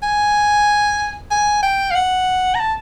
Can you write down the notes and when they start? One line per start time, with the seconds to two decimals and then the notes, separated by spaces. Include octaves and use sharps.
0.03 G#5
1.31 G#5
1.63 G5
1.91 F5
1.95 F#5
2.55 A#5
2.60 A5